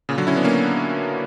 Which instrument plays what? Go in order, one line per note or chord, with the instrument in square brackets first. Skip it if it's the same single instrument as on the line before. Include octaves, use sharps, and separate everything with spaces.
[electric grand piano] A#2 C#3
D3 F#3
C#4 E4
B3 D4
A#3 C#4